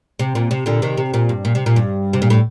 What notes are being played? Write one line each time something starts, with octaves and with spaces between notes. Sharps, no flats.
C3
A#2
C3
A#2 D3
C3 D#3
C3
A#2
G2
A#2
C3
A#2
G2
C3
A#2
A2